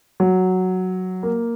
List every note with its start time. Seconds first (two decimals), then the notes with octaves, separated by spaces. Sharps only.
0.20 F#3
1.23 A#3